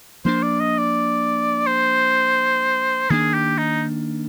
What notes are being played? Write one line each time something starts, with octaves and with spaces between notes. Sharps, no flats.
F3 A#3 D4 C5
D5
D#5
D5
C5
D#3 A#3 D4 G#4
G4
D#4